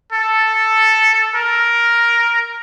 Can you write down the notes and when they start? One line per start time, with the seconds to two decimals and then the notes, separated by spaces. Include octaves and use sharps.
0.12 A4
1.35 A#4